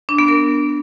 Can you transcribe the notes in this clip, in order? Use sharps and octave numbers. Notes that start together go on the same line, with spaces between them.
D4
B3
A#4